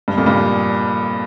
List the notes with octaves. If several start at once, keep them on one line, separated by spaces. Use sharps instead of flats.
G2
F2 A#2
G2